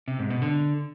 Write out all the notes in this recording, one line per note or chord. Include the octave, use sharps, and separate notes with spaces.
C3
G#2
B2
D3